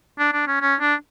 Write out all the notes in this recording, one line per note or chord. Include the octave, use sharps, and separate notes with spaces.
D4
D4
C#4
C#4
D4